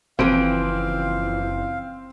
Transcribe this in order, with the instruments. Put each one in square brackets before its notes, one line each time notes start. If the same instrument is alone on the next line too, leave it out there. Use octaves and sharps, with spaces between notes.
[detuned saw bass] F#1 [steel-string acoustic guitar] E3 F3 [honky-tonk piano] C4 D7 [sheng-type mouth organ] F5